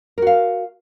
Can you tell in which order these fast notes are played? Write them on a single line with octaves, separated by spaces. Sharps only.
A#4 F#4 F5